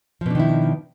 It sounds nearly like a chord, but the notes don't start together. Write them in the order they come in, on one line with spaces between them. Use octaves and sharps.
F3 B2 D4 D#3 E4